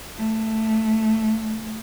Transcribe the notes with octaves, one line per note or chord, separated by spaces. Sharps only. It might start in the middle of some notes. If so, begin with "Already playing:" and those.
A3